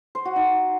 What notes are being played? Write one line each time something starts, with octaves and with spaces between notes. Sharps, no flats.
C5
F#4
D#4